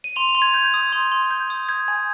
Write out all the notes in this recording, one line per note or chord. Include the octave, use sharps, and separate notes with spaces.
D#7
C6 F7
F7
C6
G#6
G6 G#6
D#6
C6
C6
G6
D#6
G6 G#6
G#5